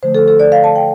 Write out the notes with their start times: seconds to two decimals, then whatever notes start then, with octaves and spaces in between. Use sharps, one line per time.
0.03 D3 F3 A3 C5
0.15 A4
0.28 A4
0.40 D5
0.52 F5
0.64 A5
0.76 G5